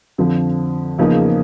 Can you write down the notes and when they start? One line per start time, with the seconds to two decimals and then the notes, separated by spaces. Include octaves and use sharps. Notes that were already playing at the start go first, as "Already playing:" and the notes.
0.18 F2 D3 F3
0.98 E2 C#3 F3 A#3 D#4